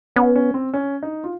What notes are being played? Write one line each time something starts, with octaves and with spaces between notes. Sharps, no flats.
B3 C#4
C#4
C4
C#4
D#4
F4